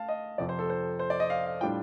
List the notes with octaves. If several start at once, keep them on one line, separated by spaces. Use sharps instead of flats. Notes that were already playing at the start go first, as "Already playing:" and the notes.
Already playing: A3 F5 A5
D#5
F2 C3 F3 D5
C5
A4
C5
C5
D5
D#5
F5
F5
A2 G3 D4 F4 G5